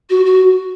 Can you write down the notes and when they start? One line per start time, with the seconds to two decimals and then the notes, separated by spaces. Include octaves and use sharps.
0.09 F#4
0.25 F#4